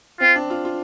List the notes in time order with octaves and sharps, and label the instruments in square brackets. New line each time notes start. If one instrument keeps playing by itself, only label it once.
[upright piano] C4 [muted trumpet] F4
[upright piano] D4
F4
F4